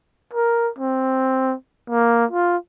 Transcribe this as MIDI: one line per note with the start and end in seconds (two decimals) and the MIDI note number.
0.33 0.69 70
0.78 1.55 60
1.90 2.25 58
2.31 2.57 65